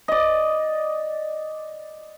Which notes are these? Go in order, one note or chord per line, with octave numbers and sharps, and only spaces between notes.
D5 D#5